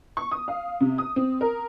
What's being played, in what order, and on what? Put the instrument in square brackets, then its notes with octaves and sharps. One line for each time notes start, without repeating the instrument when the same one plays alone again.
[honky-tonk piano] C#6
D#6
F5
C3
D#6
C4
A#4